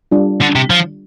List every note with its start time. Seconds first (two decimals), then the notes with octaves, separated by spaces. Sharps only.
0.12 G3 D4 F4
0.42 D3
0.56 C3
0.70 F3